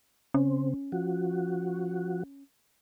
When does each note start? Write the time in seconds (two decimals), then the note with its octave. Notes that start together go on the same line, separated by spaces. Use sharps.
0.34 C#3 C4 C#4
0.92 F3 F#4